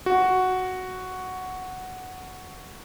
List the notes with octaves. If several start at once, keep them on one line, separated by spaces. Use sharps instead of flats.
F#4